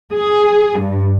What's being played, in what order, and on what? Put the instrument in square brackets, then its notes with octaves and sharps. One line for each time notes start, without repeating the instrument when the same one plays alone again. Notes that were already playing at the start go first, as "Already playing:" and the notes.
[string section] G#4
G2